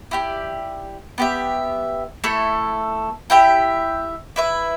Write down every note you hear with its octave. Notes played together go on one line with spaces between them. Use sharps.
E4 G4 D5
B3 G4 E5
A3 E4 A4
E4 G4 E5 G5
E4 B4 E5